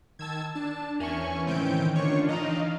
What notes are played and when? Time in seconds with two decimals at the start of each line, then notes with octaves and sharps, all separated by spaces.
0.19 D#3 A5 E6 G#6
0.55 D4 A5
1.00 E2 E3 C#4 A#4 E5 G#5 C#6
1.47 C#2 A2 D#3 C4 G6 D7
1.96 D3 D4 F4 C#5 C#6
2.29 E3 D#4 D#5 F5 A#5